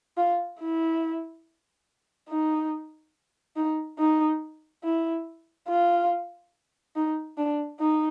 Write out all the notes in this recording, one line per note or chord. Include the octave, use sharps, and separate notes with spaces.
F4
E4
D#4
D#4
D#4
E4
F4
D#4
D4
D#4